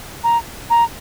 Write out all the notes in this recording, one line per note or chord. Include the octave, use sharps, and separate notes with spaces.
A#5
A#5